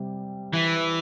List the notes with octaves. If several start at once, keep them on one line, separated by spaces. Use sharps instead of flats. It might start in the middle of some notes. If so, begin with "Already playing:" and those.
Already playing: C3 G3
E3